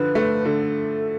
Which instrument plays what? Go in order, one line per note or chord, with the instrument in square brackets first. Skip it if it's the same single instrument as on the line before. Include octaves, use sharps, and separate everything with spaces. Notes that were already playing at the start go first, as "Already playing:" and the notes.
Already playing: [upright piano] D3 F3 [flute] B4
[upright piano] A3
[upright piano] D3 [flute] A4